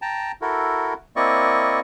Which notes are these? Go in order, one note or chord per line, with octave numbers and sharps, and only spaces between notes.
G5 A5 A#5
E4 F#4 A4 A#4
A#3 C4 E4 D5 D#5 C#6